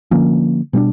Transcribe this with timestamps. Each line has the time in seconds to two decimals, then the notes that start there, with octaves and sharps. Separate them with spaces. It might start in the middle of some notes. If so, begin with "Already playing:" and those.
0.11 D3 F3 A#3 C#4
0.73 B2 G3 B3 D4